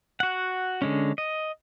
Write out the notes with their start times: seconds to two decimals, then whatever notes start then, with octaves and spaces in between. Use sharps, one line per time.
0.20 F#4 F#5
0.82 D3 G#3 C#4
1.18 D#5